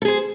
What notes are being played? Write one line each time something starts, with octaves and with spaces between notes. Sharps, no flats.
G#4 A4 C5